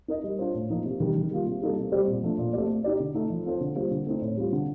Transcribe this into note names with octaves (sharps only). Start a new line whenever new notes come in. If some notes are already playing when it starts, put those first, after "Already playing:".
D#4 A#4 D#5
G3
D4 F4 C5
A2
F3 A#3 D#4
C3
D#3 G3
D#3
G3 A#3 F4
C3
G3 A#3 D#4 A4
C3
G3 C4 G4 D5
A#2
F3 A3 D4
A#2
A3 C4 G4 D5
A3
D#4 G4 D5
D3
A3 D#4
F3
C4 F4 A4 C5
D3
G3 A#3 F4 C5
D3
A3 C4 D#4
A2
G3 C4 F4
D3